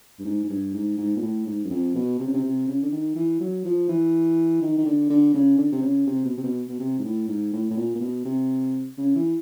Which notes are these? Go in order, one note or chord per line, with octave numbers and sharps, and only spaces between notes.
G2
G#2
G#2
G2
G#2
G#2
A#2
A2
G#2
F#2
F2
B2
C3
C#3
C3
C3
C#3
D3
D#3
E3
F#3
F3
E3
D#3
D#3
D3
D3
C#3
D3
C3
C#3
C3
B2
C3
B2
B2
C3
G#2
A2
G#2
A2
A2
A#2
A#2
B2
C3
C#3
E3